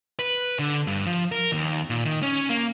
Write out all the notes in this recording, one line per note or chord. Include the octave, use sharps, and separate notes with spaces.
B4
D3
G2
F3
A#4
D#2
A#2
D#3
C#4
A#3